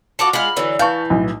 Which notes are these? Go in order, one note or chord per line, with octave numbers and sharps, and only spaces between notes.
F4 F#4 A4 F#5 D6
G#3 F4 F#5 B5 F6
D3 E3 F#3
E3 F5 A5 C#6 G6
B1 A2